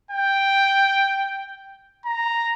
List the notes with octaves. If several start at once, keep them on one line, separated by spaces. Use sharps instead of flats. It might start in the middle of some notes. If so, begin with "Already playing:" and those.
G5
A#5